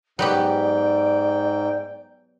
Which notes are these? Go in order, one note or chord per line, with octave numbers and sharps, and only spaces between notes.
G#2 F#3 B3 G4 D5 G5